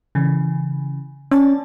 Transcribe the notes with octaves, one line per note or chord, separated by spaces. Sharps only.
C#3 E3
C#4 D5 A5